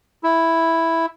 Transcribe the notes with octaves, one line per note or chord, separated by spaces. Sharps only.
E4